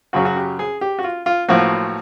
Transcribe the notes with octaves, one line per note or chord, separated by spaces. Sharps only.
F#2 C#3 F#3 F#4
F#4
G4
G#4
G4
F#4
F4
F4
B1 A2 F3 A#3 F#4